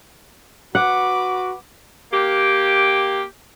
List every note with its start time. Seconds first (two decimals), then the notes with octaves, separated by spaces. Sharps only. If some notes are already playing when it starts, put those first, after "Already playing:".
0.75 F#4 B4 F#5 D6
2.12 A#3 G4